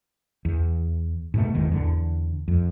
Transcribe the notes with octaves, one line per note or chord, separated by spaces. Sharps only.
E2
G#2 B2 A3
G#1 E2 G#2 D#3
E2 D3
F2